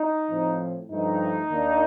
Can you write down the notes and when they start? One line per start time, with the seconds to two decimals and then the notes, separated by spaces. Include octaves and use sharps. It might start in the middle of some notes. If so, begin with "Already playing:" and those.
Already playing: D#4
0.29 A2 F3 C4
0.89 G2 F3 A3 D#4
1.50 D#2 D#3 A#3 D4